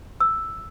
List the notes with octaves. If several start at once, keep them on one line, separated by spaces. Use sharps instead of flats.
E6